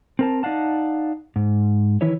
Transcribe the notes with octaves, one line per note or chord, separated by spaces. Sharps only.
C4 A#4 A5
D#4 D5 F5 F#5 A5
G#2
D#3 E3 E4 B4 C#5